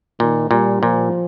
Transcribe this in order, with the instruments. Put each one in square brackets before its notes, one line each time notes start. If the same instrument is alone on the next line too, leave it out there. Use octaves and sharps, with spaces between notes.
[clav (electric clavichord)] A#2 [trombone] D#3
[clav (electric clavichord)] A#2 [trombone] G3
[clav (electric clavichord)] A#2 [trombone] F3